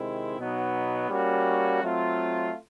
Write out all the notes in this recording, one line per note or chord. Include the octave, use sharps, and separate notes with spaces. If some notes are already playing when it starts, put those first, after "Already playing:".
Already playing: C3 D#3 G#3 C4 E4
B2 F#3 B3 D#4
G3 A#3 C#4 F#4
F#3 A3 C4 F4